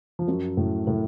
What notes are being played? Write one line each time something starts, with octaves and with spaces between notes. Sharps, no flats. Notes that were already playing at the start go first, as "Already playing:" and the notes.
F3
F#2 F#3
A2
A2